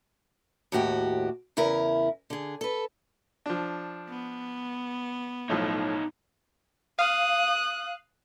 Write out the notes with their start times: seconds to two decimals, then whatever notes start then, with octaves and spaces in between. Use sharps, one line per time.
0.72 D#2 A2 F#4 G4
1.57 E2 C#3 E4 A#4
2.30 D3 G#4
2.61 A4 B4
3.46 F3 D4
4.09 B3
5.50 B1 A2 F3 D#4 C#5
6.99 F5 D#6 F#6